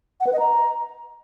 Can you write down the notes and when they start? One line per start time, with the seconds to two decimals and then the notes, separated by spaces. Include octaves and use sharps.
0.20 F#5
0.27 B4
0.33 D#5
0.39 A#5